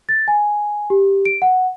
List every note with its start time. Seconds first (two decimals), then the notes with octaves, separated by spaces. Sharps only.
0.09 A6
0.28 G#5
0.90 G4
1.25 D7
1.42 F#5